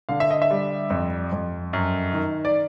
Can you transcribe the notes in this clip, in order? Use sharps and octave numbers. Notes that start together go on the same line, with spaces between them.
D3 F5
E5
D#5
E5
G3
F2
F2
F#2
D#3
D5